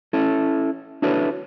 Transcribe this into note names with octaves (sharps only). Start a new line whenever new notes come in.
C#4 E4 A4
D4 E4 F#4 A4 B4 C#5